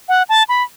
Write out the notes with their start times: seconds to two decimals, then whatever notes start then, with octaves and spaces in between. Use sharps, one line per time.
0.09 F#5
0.29 A5
0.49 B5